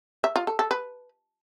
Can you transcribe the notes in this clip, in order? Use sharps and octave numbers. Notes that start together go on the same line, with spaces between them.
E5
F4
A4
A4
B4